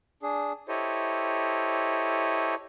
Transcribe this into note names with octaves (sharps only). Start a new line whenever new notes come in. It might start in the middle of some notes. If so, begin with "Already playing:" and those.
D4 G#4
E4 G4 A4 C5 C#5 D#5